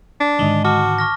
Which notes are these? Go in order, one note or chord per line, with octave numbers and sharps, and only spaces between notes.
D4
G#2 D3 D#3 G#3 G7
F#4 A5 D6 F6
C#6 F6 A#6